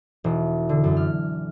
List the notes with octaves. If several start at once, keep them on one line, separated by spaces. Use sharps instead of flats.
E1
D3
F#2
F6